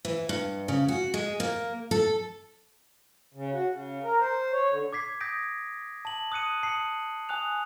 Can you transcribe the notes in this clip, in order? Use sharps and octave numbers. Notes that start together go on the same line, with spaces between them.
E3
G2
C#3
F#4
G#3
A#3
A4
C#3
F#4
C#3
A#4
C5
C#5
D3
D6 G#6 B6 C7
D#6 G6 G#6 A#6 B6 D7
A5 F#7
D#6 F#6 C#7 D#7
A5 D#6 C7 C#7 F#7
G#5 D#6 F#6 F7